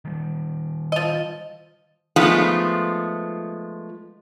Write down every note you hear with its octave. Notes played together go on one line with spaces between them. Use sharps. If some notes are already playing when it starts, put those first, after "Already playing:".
D#3 G3
F3 D#5
F3 G#3 A3 B3 D#4 F4